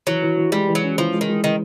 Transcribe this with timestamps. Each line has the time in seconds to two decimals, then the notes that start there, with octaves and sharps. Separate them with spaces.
0.07 E3 F#3
0.22 E3
0.37 E3
0.52 G3 G#3
0.68 E3
0.75 F#3
0.83 C#4
0.98 E3 F3
1.13 G#3
1.21 D#3
1.29 G#3
1.44 D#3 E3